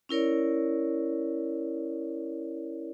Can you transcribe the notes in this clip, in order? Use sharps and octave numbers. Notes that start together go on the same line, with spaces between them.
C#4 E4 A#4 C#5 D5